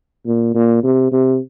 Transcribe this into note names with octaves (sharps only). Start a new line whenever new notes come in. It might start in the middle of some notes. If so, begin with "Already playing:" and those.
A#2
A#2
C3
C3